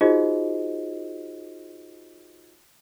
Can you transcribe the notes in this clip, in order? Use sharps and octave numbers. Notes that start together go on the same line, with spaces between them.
D#4 F4 F#4 G#4 C5 D#5